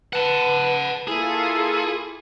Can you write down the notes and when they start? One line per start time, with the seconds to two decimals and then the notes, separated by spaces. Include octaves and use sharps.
0.13 B4 F#5 A5
1.08 A#3 E4 F4 G#4 A4